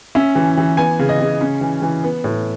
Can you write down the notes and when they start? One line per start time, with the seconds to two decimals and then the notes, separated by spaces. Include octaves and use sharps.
0.15 C#4 E5
0.35 E3
0.57 E3
0.77 B3 G#5
0.99 C#3
1.09 D#5
1.20 C#3
1.41 C#4
1.61 E3
1.82 E3
2.04 B3
2.24 A2